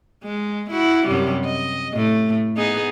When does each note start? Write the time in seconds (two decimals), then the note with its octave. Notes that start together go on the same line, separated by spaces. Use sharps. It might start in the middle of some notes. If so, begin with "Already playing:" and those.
0.24 G#3
0.71 E4 F#4
1.07 F#2 C3 G3
1.45 D#5
1.93 A2 A3
2.57 B3 D#4 G#4